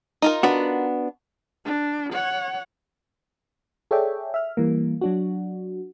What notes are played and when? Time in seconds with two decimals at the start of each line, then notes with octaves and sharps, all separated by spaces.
0.22 D#4 F4 A#4
0.43 B3 D4 F#4
1.65 D4
2.13 C#5 F#5
3.91 G#4 A4 C#5 D5 E5 G5
4.34 E5 F6
4.57 E3 G3 A#3
5.01 F#3 D4 F#4